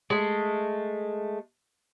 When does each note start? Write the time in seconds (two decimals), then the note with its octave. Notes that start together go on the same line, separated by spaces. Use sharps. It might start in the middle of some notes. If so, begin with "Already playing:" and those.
0.10 G#3 A3